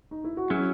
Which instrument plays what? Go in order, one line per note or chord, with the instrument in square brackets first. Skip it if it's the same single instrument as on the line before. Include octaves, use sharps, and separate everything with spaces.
[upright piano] D#4
E4
F#4
[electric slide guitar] F#3 C#4 E4 [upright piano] G#4